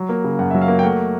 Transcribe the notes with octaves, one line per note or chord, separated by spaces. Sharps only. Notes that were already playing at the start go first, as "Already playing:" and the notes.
Already playing: F#3
A#3
C#3
F#2 F#5
F#3 E5
F5
A#3
G5
A3 F#5